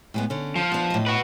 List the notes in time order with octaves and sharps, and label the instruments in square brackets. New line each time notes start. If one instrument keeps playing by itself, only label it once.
[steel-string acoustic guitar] A2 G#3 B3
D3 C#4
[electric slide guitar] F3
[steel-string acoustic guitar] B3 D4
A2 D#5
[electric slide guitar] F#4 B4